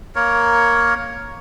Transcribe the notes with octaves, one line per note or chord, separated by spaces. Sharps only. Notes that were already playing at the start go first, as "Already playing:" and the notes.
A#3 A#4 C#5